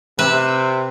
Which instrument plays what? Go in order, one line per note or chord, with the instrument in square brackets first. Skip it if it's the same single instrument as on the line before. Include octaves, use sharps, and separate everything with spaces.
[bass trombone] C3 [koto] B4 E5